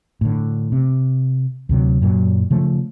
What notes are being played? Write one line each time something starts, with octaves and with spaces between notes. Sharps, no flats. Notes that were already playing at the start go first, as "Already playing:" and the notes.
A2 D3
C3
D2 C3 F#3
F#2 A#2 F#3
C#3 F3 A3